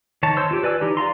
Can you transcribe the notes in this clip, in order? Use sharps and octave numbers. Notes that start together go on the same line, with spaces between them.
D#3 C#5 A5
C5 C#5 C6 E6
F4 G4
B4 D5 G#5 E6
E3 D#4 G4
D5 F5 A#5 C6